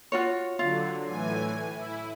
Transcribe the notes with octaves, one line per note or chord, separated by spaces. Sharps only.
F4 F#4 C#5
D3 F#3 F4
A2 E3 G#5
E4